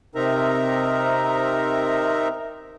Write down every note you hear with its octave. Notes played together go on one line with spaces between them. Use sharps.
C3 C4 D#4 A#4 E5 A#5